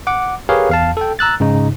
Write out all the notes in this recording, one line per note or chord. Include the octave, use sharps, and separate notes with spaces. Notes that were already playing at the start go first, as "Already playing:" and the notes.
F#5 D6
G4 G#4 A#4 B4 C#5 F5
E2 F5 A5
A4 G5
A#5 E6 F#6 A6
G#2 C#3 D#4